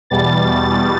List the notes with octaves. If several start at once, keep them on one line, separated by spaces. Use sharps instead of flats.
E2 B2 G3 A6